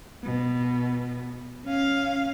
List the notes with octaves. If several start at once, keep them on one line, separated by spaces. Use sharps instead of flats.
B2
C#4 F5